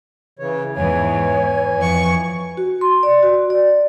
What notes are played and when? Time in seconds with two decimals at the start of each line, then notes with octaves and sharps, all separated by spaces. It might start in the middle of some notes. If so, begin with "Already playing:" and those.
0.39 C#3 E3 C#5
0.76 E2 G#2 E3 C#5 G#5
1.78 F2 C#6
2.57 F#4
2.81 C6
3.03 D5
3.23 F#4
3.50 D5